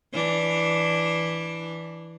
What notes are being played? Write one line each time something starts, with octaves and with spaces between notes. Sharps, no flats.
E3 D4